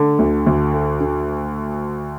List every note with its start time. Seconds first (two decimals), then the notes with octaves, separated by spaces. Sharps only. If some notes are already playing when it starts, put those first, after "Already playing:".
Already playing: D3 A3
0.19 D2
0.47 D2
0.74 A3
1.01 D3